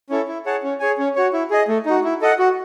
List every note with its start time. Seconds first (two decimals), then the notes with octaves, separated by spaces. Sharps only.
0.10 C#4 E4 A4
0.28 E4
0.46 G#4 C#5 F#5 A5
0.63 C#4
0.80 G#4 C#5 G#5
0.98 C#4
1.16 F#4 C#5
1.33 E4
1.51 G#4 D#5
1.68 A3
1.86 D#4 F#4
2.04 E4
2.21 A4 D#5 F#5
2.39 F#4